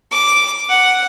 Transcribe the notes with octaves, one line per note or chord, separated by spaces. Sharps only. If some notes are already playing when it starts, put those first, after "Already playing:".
D6
F#5